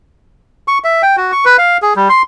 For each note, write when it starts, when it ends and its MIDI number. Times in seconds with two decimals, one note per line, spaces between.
0.68 0.78 85
0.84 1.02 76
1.03 1.16 79
1.17 1.32 66
1.32 1.45 85
1.45 1.57 71
1.58 1.77 77
1.82 1.93 68
1.96 2.08 55
2.09 2.22 84